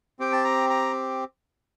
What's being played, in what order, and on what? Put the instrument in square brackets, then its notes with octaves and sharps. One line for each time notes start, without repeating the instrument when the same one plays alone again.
[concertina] C4 G4 G5
A5
A#5
A#5